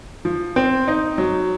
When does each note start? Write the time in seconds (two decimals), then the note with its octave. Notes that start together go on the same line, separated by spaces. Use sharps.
0.25 F3
0.56 C4
0.88 D#4
1.18 F#3